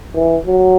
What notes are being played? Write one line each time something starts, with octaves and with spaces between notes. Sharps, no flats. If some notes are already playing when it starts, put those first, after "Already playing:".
E3
F#3